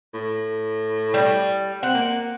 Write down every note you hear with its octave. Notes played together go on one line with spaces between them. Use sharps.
A2
G3
C4 F#5
A#3